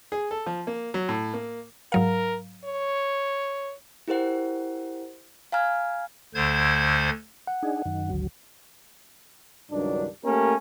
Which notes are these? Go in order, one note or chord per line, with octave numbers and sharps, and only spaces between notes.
G#4
A4
F3
A#3
F#3
A2
A#3
G#2 F#3 A#4 F5
C#5
E4 G4 A#4 C5 F#5
F5 G#5 A#5 F6 G#6
D2 D3 C5 G#6
F#5
D4 D#4 G#4
F#2 D#3
G#1 D2 F#3
C#2 G2 D#3 F#3 D4
A3 A#3 C#4 G4 A#4